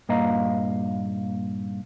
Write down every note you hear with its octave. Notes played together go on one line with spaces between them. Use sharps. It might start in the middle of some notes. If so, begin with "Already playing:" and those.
G2 A#2 A#3 D#5 F5 A#5